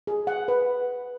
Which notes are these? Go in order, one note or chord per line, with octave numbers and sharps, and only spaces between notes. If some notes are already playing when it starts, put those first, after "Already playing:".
G#4
F#5
B4